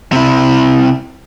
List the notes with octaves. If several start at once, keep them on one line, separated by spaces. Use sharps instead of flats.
C3 E4